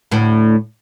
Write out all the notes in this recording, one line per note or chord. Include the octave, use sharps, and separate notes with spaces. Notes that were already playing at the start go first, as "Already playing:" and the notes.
D2 A2